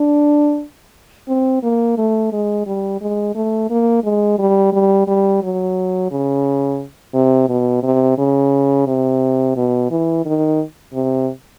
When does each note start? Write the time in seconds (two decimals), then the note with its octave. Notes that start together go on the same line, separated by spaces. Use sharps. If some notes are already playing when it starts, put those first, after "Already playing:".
Already playing: D4
1.29 C4
1.63 A#3
1.98 A3
2.33 G#3
2.66 G3
3.01 G#3
3.35 A3
3.70 A#3
4.04 G#3
4.39 G3
4.73 G3
5.08 G3
5.43 F#3
6.11 C#3
7.14 C3
7.49 B2
7.83 C3
8.18 C#3
8.87 C3
9.57 B2
9.91 E3
10.26 D#3
10.94 C3